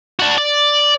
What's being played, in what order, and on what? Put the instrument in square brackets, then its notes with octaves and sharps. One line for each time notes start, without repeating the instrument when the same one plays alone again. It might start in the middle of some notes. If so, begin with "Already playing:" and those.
[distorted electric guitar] D4 F#4
D5